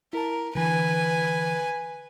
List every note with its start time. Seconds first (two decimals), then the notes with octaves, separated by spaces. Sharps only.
0.13 E4 A#4 A5
0.55 D3 E3 B4 G#5